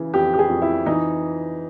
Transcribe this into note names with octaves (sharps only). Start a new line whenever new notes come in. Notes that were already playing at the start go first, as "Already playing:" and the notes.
Already playing: C#3 E3
F2 G4
G4
G#4
F2
E4
E3 D#4